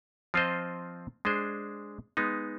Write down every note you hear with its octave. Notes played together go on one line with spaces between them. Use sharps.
F3 C4 F4 C5 D#5
G#3 D4 G#4 C5
G#3 B3 D#4